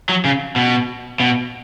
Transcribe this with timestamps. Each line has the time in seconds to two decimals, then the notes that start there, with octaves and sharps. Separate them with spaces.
0.09 F#3
0.25 C#3
0.56 B2
1.20 B2